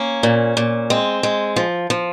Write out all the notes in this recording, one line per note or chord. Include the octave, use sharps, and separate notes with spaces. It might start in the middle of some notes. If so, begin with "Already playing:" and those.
Already playing: A#3 C#4
A#2
A#2
G#3 C4
G#3
F3
F3